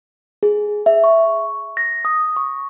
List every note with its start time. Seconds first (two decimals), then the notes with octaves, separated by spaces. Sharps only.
0.43 G#4
0.86 E5
1.04 C#6
1.77 A#6
2.05 D#6
2.37 C#6